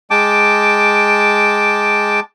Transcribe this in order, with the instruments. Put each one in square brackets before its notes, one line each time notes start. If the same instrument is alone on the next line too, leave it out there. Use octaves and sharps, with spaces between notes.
[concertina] G#3 G5 A5 D6